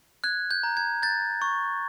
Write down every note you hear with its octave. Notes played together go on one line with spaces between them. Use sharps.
F#6 G#6
G6
A#5
G#6
G6 A6
C#6